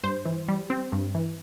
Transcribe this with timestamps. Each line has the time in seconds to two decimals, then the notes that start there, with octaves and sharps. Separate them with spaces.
0.03 G2 C5
0.25 E3
0.48 G3
0.70 C4
0.92 G2
1.15 E3